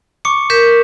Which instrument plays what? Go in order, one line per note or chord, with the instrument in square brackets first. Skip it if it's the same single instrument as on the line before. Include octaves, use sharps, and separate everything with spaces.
[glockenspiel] C#6 D6 C#7
[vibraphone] A#4 [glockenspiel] G6 B6 E7